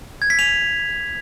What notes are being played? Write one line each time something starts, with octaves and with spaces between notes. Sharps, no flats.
G#6
B6
F7